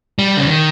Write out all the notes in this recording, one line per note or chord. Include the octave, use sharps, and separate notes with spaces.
G3
C#3
D#3